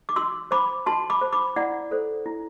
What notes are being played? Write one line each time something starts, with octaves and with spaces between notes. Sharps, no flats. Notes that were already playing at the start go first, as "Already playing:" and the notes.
D6
F#4 C6 E6
C5 B5 D6
F#4 A5 C6
B5 D6
C5
B5 D6
E4 D5 F#5
A4 C5
E4